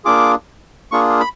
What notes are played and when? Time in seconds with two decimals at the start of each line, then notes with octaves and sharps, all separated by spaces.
0.05 A#3 D4 F4 G#4 D6
0.92 A#3 D4 F4 G#4 C#6
1.20 B5